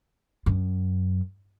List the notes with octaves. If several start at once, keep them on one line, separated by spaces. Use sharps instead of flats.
F#2